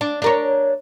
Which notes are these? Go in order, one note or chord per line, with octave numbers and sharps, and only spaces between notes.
D4
D4 A#4 C#5